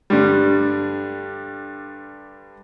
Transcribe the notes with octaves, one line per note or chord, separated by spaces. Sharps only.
G2 D3 G3